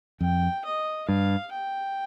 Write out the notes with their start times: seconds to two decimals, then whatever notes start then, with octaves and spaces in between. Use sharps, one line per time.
0.21 F2 G5
0.65 D#5
1.08 G2 F5
1.52 G5